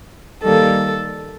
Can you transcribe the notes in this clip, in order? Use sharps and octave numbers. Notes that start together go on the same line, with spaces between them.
D#3 G3 A#3 A4